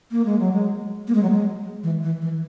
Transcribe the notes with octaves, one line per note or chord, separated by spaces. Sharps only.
A#3
G#3
F#3
G#3
A#3
G#3
F#3
G#3
E3
E3
E3